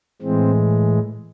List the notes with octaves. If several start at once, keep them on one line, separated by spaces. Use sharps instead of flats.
A2 E3 G#3 C4